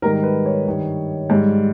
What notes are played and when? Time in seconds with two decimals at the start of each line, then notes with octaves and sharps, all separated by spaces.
0.02 G#2 D#3 G3 A#4
0.23 B4
0.46 C#5
0.67 G2 D#3 G3
1.30 G#2 G3